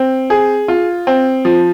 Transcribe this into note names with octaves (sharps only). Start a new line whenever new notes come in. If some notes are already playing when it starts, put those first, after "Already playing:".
Already playing: C4
G#4
F4
C4
F3